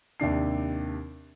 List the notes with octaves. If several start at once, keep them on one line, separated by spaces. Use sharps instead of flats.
D#2 C3 D4 C7